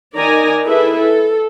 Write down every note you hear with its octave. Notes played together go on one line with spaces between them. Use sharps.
D#3 D#4 D5 G#5 A#5
E4 G#4 A4 B4 E5
A4